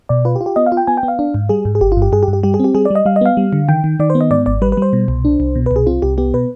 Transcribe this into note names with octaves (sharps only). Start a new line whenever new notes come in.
B2 D5
F4 B4
G4
F4
G4
B3 D#5
F5
F4
G5
B3 G#5
G5
B3
F5
D4
G#2
G3 G#4
G#2
G#4
G1 G4
G2 F4
G4
G2 G#4
G4
G2
G4
G3 G4
G#4
C4 G4
G3 G#4
D5
G3 D#5
G3 F5
D#5
B3 F5
G3
D3
D#3 G5
D#3
D#3 D5
C5
B3
D#5
G#2 D5
G#1 D5
G3 B4
B4
G3 C5
B2
C2
D4
C2
B2
C2 B4
G#4
C4 F4
C2 G4
B3 G4
B2 B4